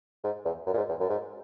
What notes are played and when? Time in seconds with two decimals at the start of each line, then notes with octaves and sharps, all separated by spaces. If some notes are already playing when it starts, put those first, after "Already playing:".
0.24 G#2
0.45 E2
0.67 F#2
0.73 A#2
0.77 G#2
0.89 E2
1.00 F#2
1.10 G#2